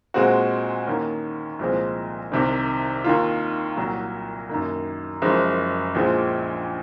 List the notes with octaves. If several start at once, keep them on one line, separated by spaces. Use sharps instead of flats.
A#2 G#3 C4 F#4
D#2 D#3 A#3 C#4
C2 A#2 F3 G#3 C4
C2 C3 D#3
D#2 D#3 A#3 F4
C2 A#2 F#3
F#2 D#3 A#3
F#1 F#2 F3 G#3
A#1 A#2 F3 G#3